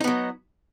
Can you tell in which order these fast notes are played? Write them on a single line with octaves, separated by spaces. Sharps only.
D#4 B3 F#3